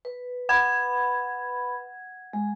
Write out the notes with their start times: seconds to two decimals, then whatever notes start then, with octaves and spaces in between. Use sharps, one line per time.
0.05 B4
0.49 B4 F#5 B5 G#6
2.33 G#3